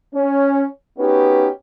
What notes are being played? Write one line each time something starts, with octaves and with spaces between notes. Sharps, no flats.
C#4
B3 C#4 D#4 F#4 G4 B4